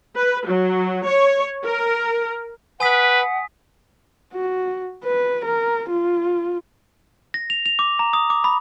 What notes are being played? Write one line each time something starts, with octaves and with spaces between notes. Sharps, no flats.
B4
F#3
C#5
A#4
B4 F#5 G#5 D#6 B6
F#4
B4
A#4
F4
A#6
F7
F7
D6
A#5
D#6
D6
B5